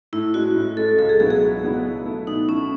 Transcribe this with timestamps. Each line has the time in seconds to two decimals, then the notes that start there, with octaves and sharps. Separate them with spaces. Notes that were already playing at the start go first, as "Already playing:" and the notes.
0.13 A2 E4
0.34 G#3 C#4 F#4
0.56 A2
0.77 G#3 C#4 A4
0.98 C#2 A4
1.09 G#4
1.20 B2 F#3 B3 E4 G#4
1.31 G#4
1.42 C#2
1.63 B2 F#3 B3 E4
1.84 B2
2.06 A3 E4
2.27 B2 D#4
2.48 A3 C#4 E4